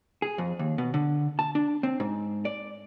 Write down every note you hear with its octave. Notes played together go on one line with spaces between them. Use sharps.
G#4
F2
D#2
B2
D3
A5
D4
C4
G#2
D5